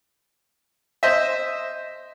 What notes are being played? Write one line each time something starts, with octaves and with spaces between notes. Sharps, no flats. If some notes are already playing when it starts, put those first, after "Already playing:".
C5 D#5 E5